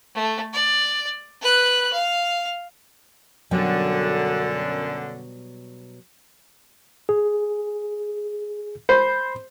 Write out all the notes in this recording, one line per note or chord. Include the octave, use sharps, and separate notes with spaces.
A3
D5
B4 F#6
F5
F#2 B2 D3 F#3 G3
G#4
C5 B5